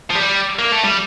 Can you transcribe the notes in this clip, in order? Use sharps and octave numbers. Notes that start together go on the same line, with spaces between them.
F3
G3
A#3
A3
G3